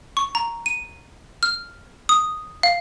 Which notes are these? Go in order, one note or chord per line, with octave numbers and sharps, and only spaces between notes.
C#6
A#5
D#7
F6
D#6
F5